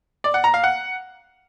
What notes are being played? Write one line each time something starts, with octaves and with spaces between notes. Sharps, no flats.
D5
F#5
A#5
F5
F#5